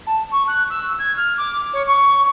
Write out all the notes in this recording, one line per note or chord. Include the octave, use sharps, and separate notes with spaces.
A5
C#6
F#6
E6
G#6
F6
D6
C#5
C#6